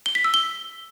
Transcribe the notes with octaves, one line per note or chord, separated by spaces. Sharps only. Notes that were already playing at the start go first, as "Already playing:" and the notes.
G7
B6
E6
G7